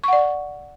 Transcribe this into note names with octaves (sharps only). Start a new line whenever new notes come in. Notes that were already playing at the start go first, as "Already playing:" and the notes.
D5 F#5 C#6